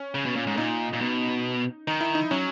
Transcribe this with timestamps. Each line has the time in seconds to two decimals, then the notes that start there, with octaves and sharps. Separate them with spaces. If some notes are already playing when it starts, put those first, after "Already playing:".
Already playing: C#4
0.15 C#3
0.25 B2
0.36 A#2
0.47 G#2
0.57 A#2 D#4
0.93 A#2
1.01 B2
1.87 D#3 D#4
2.01 E4
2.15 D#4
2.31 F#3 C#4